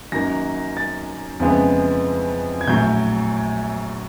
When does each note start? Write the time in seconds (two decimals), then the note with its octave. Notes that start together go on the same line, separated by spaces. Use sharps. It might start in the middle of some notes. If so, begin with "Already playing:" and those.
0.12 F#2 D#3 F#3 A#3 A#6
0.77 A6
1.40 F2 C#3 E3 G#3 B3
2.61 G#6
2.68 A#1 A2 F#3 G6